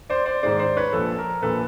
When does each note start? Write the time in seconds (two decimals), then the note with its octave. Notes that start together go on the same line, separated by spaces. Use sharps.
0.10 C5 D5
0.26 C5 D5
0.43 G#2 D#3 G#3 C5 D5
0.59 C5 D5
0.77 B4 C#5
0.93 A#1 A#2 F3 A4
1.19 A#4
1.42 A#1 A#2 F3 A4 B4